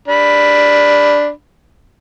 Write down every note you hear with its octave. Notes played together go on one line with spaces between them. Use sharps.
D4 B5